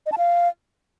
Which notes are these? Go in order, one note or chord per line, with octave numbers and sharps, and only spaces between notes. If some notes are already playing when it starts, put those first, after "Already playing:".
D#5
A5
F5